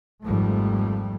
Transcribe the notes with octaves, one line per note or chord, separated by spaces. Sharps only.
G#1 F2 G#2 F3 G3 A3